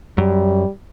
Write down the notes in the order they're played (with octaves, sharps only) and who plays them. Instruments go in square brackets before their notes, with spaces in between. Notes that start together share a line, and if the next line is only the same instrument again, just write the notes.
[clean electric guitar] F#2 [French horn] G3